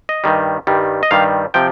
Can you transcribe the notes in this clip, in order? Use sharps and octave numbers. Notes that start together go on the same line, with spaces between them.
D#5
G2 D#3 G3
G2 D#3 G3
D#5
G2 D#3 G3 F5
C3 F3 G5